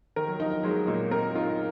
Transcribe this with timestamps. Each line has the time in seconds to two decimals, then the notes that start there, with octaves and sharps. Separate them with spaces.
0.16 D#3 A#4
0.28 F#3
0.40 F3 D#4
0.64 F#3 G#3
0.87 A#2 A#3
1.11 C4 A#4
1.35 D#4 F4